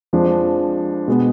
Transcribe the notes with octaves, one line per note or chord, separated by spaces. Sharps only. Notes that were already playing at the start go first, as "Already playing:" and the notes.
F2 F3 G#3 D4
B2 G#3 B3